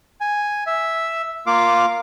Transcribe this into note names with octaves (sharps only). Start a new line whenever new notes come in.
G#5
E5
A#3 F4 F5 D6